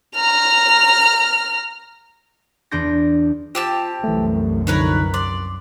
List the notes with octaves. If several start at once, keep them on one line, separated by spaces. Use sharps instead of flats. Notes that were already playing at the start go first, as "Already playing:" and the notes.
A#5 F6
E2 E3 D4 C6 G6 A#6
C4 F4 G4 A5
C2 F#2 E3 A3
D3 F3 D#4 A#4 B4 C#5
D5 C6